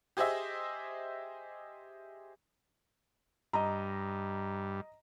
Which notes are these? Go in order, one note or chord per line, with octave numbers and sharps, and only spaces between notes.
G4 G#4 C5 D#5 E5
G2 D#5 A#5